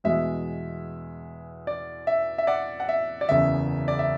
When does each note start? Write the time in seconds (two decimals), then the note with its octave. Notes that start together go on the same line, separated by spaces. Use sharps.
0.04 E2 B2 G#3 E5
1.67 D5
2.07 E5
2.38 E5
2.47 D5 F#5
2.80 F#5
2.89 E5
3.21 D5
3.29 F#1 E2 C#3 E5
3.88 D5
3.99 E5